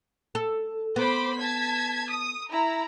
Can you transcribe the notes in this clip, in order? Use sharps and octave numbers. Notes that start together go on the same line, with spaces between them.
A4
B3 C5 B5 D6
A5 G#6 B6
D#6
E4 A#5